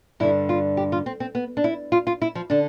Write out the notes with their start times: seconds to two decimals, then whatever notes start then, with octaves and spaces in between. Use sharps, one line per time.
0.20 G2 D3 E4
0.49 F4
0.77 G4
0.92 F4
1.06 C4
1.20 C4
1.35 B3
1.57 D4
1.64 E4
1.92 F4
2.07 F4
2.22 E4
2.35 F3
2.50 D3 D4